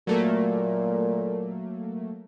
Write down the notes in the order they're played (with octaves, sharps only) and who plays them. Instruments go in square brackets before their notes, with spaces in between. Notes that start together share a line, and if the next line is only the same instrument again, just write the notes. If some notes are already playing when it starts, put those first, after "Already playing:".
[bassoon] A#2 [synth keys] F#3 A3 A#3